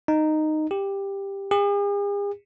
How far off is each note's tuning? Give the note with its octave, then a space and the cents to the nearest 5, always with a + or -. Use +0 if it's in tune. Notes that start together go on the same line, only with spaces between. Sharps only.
D#4 -10
G4 +10
G#4 -45